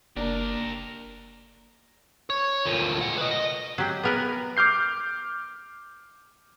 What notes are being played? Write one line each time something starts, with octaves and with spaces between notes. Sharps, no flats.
F#1 A#3 D4 G4 A#4 D5 A#5
C#5
D2 A#2
G#3 F#5
B4 D#5
D#5
F#3 G4
B3 A#4 B4
D6 F6 G6 C7